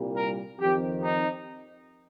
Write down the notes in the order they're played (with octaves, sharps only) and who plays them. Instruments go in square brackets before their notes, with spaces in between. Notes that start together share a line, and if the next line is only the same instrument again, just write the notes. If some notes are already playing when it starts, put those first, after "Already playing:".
Already playing: [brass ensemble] C2 A#2 G3
A#4
F2 D#3 C4 G4
D#4